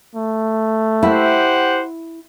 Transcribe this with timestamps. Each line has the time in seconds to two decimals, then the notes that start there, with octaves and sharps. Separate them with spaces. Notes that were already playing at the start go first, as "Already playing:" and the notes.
0.15 A3
1.03 E4 G4 C5 F#5